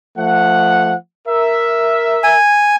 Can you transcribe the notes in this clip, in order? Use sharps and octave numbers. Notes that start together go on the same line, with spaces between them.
F3 A3 F#5
A#4 E5
G#5